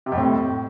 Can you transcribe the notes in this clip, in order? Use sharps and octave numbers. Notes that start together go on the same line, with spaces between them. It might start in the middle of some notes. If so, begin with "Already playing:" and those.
C3
F2
A2